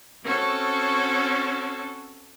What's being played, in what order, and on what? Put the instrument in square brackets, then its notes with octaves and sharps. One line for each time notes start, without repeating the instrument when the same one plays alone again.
[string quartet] C4 C#4 F#4 A4